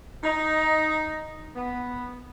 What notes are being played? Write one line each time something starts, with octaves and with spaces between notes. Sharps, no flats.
D#4
B3